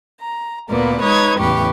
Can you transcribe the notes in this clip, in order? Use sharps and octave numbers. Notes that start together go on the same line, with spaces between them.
A#5
D2 A#2 A#3 B3 B4 D5
G#3 D#4 B4 C#5 D#6 G#6
E2 A2 C#3 G4 B4 C#6